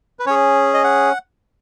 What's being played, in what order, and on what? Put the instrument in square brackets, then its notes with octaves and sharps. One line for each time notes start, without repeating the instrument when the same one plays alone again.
[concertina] B4
C#4 G#4 C#5
D#5
F#5